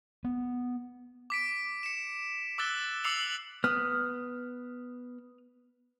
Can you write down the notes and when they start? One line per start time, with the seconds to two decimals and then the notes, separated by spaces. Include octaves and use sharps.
0.24 B3
1.30 D6 B6 D7
1.83 C#7 E7
2.58 D6 E6 F#6 A6 G7
3.04 D6 E6 C7 C#7 F7 F#7
3.64 B3 D#6 F6